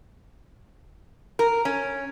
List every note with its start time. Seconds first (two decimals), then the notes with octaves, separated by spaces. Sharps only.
1.39 A#4
1.65 C#4